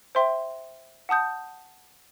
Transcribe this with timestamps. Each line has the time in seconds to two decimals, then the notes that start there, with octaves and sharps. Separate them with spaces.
0.15 C5 E5 G5 C6
1.09 F#5 A5 D#6 G6